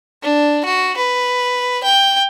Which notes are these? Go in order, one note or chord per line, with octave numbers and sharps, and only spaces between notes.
D4
F#4
B4
G5